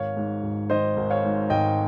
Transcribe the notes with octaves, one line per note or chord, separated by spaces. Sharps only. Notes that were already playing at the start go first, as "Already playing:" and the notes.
Already playing: G#1 C#5 F5
G#2
G#1
D#3 C5 D#5
G#1
C#5 F5
G#2
G#1 D#5 G5